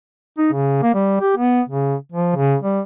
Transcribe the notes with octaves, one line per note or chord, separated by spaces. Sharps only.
D#4
C#3
A#3
G3
G4
B3
C#3
F3
C#3
G3